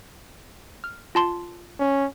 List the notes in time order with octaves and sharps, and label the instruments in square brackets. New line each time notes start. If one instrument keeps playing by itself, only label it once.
[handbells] F6
F4 A5 C6
[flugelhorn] C#4